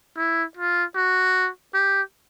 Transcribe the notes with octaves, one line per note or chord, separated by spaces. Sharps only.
E4
F4
F#4
G4